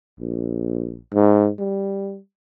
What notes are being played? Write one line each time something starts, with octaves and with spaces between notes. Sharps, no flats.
A#1
G#2
G3